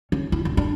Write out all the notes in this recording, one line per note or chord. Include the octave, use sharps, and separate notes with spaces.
C#4
E4
D4
D4